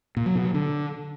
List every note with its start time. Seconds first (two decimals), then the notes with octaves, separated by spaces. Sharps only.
0.17 A#2
0.26 F#3
0.35 B2
0.45 F#3
0.54 D3